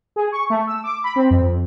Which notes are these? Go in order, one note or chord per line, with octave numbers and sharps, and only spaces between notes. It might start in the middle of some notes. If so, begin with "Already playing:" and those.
G#4
C#6
A3
E6
D6
B5
C4
F2